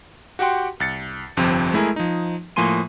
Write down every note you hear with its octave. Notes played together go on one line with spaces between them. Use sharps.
F#4 G4 F#5 G5 C6
C2 A6 C#7
G1 F2 C3 F3 C4
G#3 A3 E4 G#4 A#4
F3 D#4
A2 F3 A#3 G#5 C6 D#7